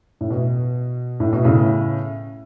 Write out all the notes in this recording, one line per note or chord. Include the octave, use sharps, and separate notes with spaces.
A2
B2
A2
B2
A2 C#3